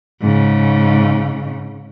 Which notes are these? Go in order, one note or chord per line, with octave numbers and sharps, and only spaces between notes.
G#2 C#3